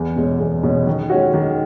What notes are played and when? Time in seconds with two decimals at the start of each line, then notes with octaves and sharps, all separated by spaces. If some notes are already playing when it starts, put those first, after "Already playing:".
Already playing: E2
0.16 B2 G#3 C#4
0.40 E2
0.63 B2 G#3 C#4
0.87 D#3
1.10 G#3 C#4 F#4
1.34 D#3